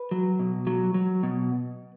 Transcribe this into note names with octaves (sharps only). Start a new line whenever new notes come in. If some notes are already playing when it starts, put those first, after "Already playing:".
Already playing: B4
F#3
B2
F#3
F#3
B2